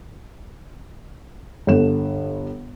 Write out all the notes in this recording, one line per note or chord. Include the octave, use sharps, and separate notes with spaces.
G1 D3 A4 E7